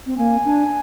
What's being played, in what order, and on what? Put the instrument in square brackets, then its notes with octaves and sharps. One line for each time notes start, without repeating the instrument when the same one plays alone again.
[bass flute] C4
[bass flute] A#3 [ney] G#5
[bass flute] D4